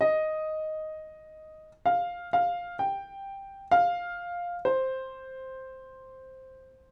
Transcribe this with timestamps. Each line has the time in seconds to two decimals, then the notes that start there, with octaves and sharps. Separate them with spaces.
0.01 D#5
1.86 F5
2.33 F5
2.79 G5
3.71 F5
4.65 C5